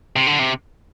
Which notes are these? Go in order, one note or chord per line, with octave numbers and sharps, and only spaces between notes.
C3
D3
C3